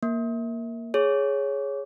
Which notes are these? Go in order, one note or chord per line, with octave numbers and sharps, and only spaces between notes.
A#3
G#4 C#5